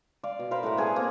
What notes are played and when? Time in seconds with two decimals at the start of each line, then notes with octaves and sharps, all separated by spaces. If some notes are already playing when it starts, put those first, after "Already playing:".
0.23 D5 F5
0.39 B2
0.51 A#4 C5 F5 B5
0.63 A2 A3 F#5 A#5
0.77 B3 G#4 A4 G#5
0.96 A#3 C4